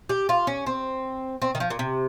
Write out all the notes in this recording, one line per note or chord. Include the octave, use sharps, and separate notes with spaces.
G4
F4
C#4
C4
C4
D#3
F3
A#2
C3